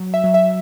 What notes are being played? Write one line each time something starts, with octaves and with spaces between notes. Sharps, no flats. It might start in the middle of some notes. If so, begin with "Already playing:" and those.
Already playing: F#3
E5
F#3
E5